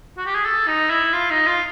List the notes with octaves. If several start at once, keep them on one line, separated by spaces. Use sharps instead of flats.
F#4
G4
G#4
A4
D#4
E4
F4
D#4
F4